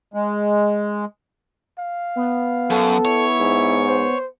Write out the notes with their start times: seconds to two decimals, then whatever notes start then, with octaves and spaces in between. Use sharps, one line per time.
0.14 G#3
1.79 F5
2.16 B3
2.70 F#2 A4
3.05 E4 C#5
3.40 G#2
3.87 C5